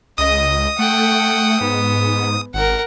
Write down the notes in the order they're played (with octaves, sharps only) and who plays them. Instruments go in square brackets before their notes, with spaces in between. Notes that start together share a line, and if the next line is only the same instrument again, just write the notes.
[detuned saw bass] C#2 [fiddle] D#5 [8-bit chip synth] D#6
[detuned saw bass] A3 [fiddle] F#5 G5
[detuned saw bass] G#2 [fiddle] B3
[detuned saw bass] G#1 [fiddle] A#4 F#5